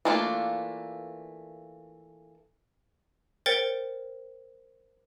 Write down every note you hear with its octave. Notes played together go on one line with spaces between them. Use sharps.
E3 A3 A#3 D4 F4
A#4 C5 C#5 G5 A6 C#7